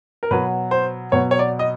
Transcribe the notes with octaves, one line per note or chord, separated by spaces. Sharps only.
A#4
B2 F#3 B3 B4
C5
B2 F#3 B3 C#5
C#5
D5
D#5